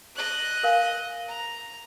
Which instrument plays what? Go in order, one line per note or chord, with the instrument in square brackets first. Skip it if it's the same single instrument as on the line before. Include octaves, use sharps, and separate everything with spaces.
[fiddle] D#5 F#6
[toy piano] A#4 F5 G#5
[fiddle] A#5